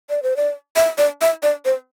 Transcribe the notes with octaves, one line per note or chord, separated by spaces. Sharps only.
D5
C5
D5
E5
D5
E5
D5
C5